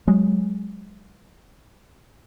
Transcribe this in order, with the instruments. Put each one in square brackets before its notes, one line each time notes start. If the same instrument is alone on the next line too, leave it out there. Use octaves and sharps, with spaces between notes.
[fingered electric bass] F#3 G#3